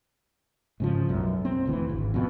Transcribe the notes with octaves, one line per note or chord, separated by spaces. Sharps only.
G#2 C#3 F3
B1 F#2
C4
E1 D2 E3
G#1
F2 B2